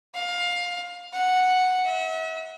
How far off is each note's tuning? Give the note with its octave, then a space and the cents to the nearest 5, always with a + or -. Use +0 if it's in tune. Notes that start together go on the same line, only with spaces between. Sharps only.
F5 +20
F#5 -5
E5 -40